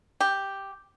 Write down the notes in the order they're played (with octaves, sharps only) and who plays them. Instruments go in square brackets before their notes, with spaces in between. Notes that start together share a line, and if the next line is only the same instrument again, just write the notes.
[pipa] G4